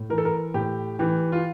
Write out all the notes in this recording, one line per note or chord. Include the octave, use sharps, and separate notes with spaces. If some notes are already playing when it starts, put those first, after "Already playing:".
Already playing: A2
E3 A#4
A4
A#4
A2 G4
E3 G4
F4